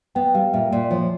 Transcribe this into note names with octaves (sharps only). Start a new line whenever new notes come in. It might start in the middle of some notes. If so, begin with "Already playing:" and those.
B3 G5
G3 F5
A#2 E5
A#2 D5
F3 C#5